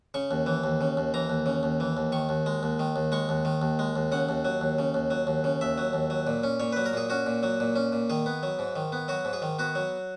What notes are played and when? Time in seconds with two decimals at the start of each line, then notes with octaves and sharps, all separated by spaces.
0.14 C#3 C#6
0.31 D#2
0.46 E3
0.64 D#2
0.81 C#3
0.97 D#2
1.14 E3 A#5
1.30 D#2
1.46 C#3
1.63 D#2
1.80 E3
1.97 D#2
2.12 D#3 C#6
2.29 D#2
2.46 G#3
2.63 D#2
2.79 D#3
2.96 D#2
3.12 G#3 C#6
3.29 D#2
3.45 D#3
3.62 D#2
3.79 G#3
3.96 D#2
4.12 C#3 F#5
4.29 D#2
4.45 F#3
4.61 D#2
4.79 C#3
4.94 D#2
5.11 F#3
5.27 D#2
5.44 C#3
5.61 D#2 E5
5.78 F#3
5.93 D#2
6.10 F#3
6.27 A#2
6.44 C#4
6.60 A#2 C#5
6.72 F#3 B4
6.86 A#4
6.93 A#2 G#4
7.10 C#4 F#4
7.26 A#2
7.43 F#3
7.60 A#2
7.76 C#4
7.92 A#2
8.10 D#3 G#4
8.26 B3
8.43 F#3
8.59 G#2
8.76 D#3
8.92 B3
9.08 F#3 F#4
9.25 G#2
9.33 G#4
9.42 D#3
9.59 B3 F#4
9.75 F#3